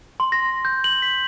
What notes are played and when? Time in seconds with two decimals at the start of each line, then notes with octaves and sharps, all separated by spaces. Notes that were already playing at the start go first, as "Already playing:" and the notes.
0.20 C6
0.32 A#6
0.65 G6
0.84 F#7
1.02 B6